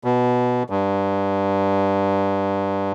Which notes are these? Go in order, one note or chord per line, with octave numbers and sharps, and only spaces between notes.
B2
G2